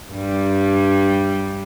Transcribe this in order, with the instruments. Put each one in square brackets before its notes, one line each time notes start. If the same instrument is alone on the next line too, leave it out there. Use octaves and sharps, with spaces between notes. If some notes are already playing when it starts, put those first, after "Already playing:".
[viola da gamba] G2 G3